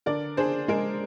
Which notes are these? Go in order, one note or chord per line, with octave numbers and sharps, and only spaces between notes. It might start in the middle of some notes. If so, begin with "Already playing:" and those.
D3 A#4 D5
D4 G#4 C5
G#3 A#4